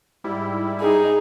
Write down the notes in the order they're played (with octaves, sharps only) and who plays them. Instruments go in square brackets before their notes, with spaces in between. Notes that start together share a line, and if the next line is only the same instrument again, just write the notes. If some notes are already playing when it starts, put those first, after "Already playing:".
[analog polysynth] G#2 G3 E4
[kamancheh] D#4 G#4